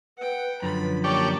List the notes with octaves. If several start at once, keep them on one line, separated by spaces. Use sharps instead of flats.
B4 F#5 G5
F#2 D3 F3 B5
A#3 F#4 G4 C#5 D5 A5